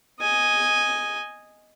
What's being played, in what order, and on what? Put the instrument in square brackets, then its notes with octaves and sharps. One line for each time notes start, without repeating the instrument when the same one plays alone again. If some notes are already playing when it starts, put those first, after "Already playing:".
[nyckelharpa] D#5 G#5